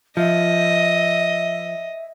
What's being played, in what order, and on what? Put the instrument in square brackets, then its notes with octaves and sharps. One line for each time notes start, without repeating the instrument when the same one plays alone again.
[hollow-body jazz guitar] F3 [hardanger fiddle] D#5 [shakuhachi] E5